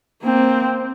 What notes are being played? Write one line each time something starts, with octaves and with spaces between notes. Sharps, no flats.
A#3 C4